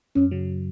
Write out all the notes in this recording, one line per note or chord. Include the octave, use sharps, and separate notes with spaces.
F#2 C#4
C#3 F#3